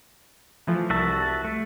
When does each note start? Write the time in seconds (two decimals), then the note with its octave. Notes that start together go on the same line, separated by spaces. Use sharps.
0.67 E3 F3 A3
0.90 C2 F#4 E5 A5
1.45 A3